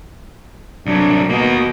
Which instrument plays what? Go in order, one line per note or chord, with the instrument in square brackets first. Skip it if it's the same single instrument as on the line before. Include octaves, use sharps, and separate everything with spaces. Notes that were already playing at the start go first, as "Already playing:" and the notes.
[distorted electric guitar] C2 F#3 [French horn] D4
[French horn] B2 [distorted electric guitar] A#3 D#5